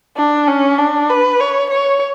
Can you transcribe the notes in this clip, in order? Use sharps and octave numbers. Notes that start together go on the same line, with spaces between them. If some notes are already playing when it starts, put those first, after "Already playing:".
D4
C#4
D4
B4
C#5
C#5